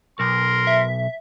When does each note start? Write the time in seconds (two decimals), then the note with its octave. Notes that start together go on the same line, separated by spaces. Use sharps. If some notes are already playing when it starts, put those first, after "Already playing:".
0.20 B1 A#4 C6
0.67 E5